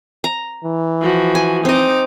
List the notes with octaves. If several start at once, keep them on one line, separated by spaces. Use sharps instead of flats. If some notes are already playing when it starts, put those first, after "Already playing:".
A#5
E3
F3 F#4
G#5
C4 D#4 D#5 D6